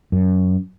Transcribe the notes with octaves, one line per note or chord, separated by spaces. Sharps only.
F#2